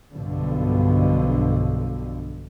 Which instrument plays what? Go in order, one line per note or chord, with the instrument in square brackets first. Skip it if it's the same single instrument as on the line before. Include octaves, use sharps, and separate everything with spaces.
[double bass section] B1 G2 B2 D3 F3